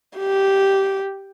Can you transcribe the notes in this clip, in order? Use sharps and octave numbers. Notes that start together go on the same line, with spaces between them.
G4